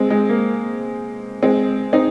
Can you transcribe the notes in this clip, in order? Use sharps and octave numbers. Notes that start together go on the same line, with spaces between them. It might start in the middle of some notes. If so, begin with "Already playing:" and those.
Already playing: G#3 C4
G#3
A#3
G#3 C4
C4 D#4